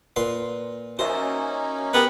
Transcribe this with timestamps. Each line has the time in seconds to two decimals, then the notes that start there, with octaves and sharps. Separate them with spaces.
0.16 A#2 B4 C6
0.99 A#3 C#4 D#4 F#4 A#4 C5 E5
1.94 B3 G4 A#4 B4